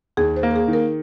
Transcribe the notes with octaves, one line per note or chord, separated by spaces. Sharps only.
D#2 G#4
C5
A#3
A#4
G#4
D#3
A#4